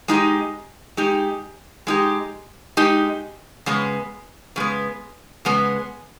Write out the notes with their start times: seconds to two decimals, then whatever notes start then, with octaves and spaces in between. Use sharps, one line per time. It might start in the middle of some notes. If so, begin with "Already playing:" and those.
0.08 G#3 D#4 G4
0.97 G#3 D#4 G4
1.87 G#3 D#4 G4
2.77 G#3 D#4 G4
3.66 C#3 G#3 B3
4.56 C#3 G#3 B3
5.45 C#3 G#3 B3